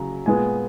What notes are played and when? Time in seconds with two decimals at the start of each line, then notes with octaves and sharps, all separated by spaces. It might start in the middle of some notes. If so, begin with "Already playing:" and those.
Already playing: C#3 F#3 A#5
0.26 A#2 G#3 B3 G#5